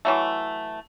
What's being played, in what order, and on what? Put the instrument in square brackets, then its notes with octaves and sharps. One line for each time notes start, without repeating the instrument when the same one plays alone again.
[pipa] E3 F#3 A3